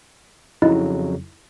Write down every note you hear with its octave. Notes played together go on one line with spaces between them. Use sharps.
F2 C#3 F#3 D#4 E4 D#5